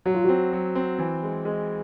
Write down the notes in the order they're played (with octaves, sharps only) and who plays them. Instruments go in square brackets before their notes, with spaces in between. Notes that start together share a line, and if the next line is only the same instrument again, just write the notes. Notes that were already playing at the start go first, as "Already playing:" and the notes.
[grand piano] F#3 [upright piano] F#4
[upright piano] F4
[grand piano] C4 [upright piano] F#4
[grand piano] F#3
C4
E3
G#3
G#3